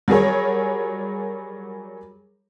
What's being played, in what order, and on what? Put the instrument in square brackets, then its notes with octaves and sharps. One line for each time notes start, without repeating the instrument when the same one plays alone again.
[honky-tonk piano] F#3 G3 G#4 A#4 C#5